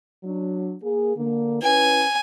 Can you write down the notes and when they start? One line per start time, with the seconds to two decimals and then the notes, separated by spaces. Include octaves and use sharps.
0.23 F#3 D4
0.81 A#3 G#4
1.17 D3 A#3
1.63 C#4 E4 B4 G#5